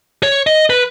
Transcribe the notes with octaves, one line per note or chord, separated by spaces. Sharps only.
C#5
D#5
B4